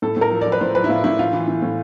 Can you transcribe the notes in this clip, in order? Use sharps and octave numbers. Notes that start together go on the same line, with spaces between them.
A2 A4
A2 A#4
F3
F3 D5
B4
A2 C5
F3 B4
E4
A2 F4
A2 E4
E3 F4
E3
E3
A2